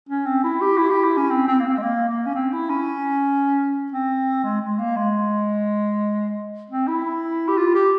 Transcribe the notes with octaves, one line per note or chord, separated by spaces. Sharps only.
C#4
C4
E4
G4
E4
G4
E4
C#4
C4
C4
A#3
C4
G#3
A#3
A#3
C#4
C4
E4
C#4
C4
G#3
G#3
A#3
G#3
C4
E4
G4
F4
G4